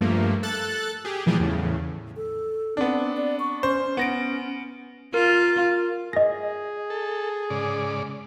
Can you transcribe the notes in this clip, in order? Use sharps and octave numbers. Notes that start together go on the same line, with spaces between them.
G2 F3 A3 A#3
A4 F#6 A6
G4 G#4
A#2 E3 F3 G3 G4 G#4
E2 A2 C#3
A4
B3 C4 D4
D5
C#6
C#4 C5
B3 C#4 A#6 D7
F4 A#4
G#4 D#5 A#6
A4
G#2 C#3 D5